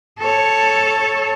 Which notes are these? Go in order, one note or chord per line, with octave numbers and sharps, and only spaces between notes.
A4 C#5